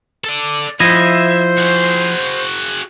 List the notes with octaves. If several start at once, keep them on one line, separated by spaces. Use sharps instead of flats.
A4 D5
F3 E4 C5 D#5 E5
F#4 G#4